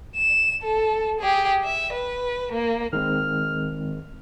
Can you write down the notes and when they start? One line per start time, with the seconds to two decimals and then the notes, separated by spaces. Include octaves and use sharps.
0.16 E7
0.63 A4
1.20 G4 G#4
1.64 E5
1.93 B4
2.52 A#3
2.93 D#3 G#3 C4 F6